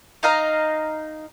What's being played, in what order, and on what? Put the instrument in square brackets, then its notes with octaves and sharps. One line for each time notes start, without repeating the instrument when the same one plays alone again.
[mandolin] D#4 D#5 F5 A#5